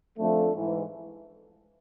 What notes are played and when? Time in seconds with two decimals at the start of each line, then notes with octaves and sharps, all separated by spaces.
0.18 F2 D3 F3 A3
0.54 G#2 E3